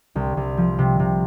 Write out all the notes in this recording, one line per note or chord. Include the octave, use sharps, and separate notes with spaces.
C2
C2
F3
C3
C3